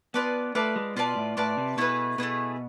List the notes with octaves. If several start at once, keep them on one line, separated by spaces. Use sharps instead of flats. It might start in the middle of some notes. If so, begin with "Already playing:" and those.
B3 F4 B4 D5 A5
A3 F4 B4 D5 A5
G#3
B2 F4 B4 D5 A5
A2
A2 F4 B4 D5 A5
C3
B2 A3 E4 G#4 B4
B2 A3 E4 G#4 B4